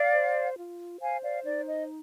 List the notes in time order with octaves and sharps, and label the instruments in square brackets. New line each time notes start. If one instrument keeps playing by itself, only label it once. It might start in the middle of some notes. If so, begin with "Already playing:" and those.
Already playing: [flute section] D5 F5
C5
F4
C5 F5 G#5
D5 F5
D#4 D5
D#5